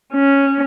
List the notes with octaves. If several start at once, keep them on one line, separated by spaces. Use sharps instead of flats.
C#4